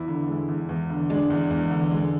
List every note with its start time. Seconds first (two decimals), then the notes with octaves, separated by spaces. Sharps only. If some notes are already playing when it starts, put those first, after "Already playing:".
Already playing: E2 E4
0.08 D3
0.28 G#3
0.48 E2
0.69 E2
0.90 D3
1.10 G#3 D4
1.30 E2
1.50 E2
1.71 D3
1.92 G#3